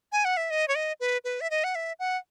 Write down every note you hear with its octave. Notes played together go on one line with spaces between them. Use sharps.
G#5
F#5
E5
D#5
C#5
D#5
B4
B4
E5
D#5
F#5
E5
F#5